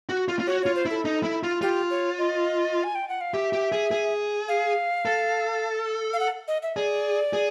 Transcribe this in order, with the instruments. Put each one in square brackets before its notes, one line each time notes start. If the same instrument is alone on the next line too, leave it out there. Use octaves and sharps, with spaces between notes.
[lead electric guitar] F#4
F4
F4
[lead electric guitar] F#4 [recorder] C#5
[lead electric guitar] F4 [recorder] C#5
[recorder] C5
[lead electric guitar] E4 [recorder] A4
[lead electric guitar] D#4
E4
F4
[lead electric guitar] F4 [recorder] G4
[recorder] C#5
D#5
G#5
G5
F#5
F5
[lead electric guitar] G4 [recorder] E5
[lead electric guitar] G4
G#4
G#4
[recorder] F5
[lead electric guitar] A4
[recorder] F5
F#5
D#5
E5
[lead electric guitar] G#4 [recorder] D5
[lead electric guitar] G#4